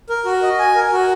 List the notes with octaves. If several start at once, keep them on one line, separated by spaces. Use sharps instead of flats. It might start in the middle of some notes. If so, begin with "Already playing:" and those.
A#4
F#4
D#5
G#5
A#4
F#4